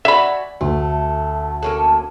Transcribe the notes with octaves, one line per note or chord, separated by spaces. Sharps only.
F#4 D5 E5 G#5 B5
D2 A3
A#3 C#4 A4